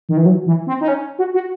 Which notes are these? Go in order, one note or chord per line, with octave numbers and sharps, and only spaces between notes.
D#3
E3
F#3
E3
C4
D#4
C#4
F#4
F#4